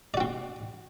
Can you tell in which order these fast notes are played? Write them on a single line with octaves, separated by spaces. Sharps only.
D5 F#4 C4